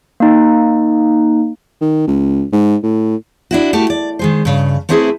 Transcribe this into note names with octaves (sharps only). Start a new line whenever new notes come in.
A#3 D#4
D#3
C#2
G#2
A2
D4 E4 F#4
A3 F#4 G4
D5
D#3 G#3 C5
G2 C#3
A3 B3 C4 E4 G#4 B4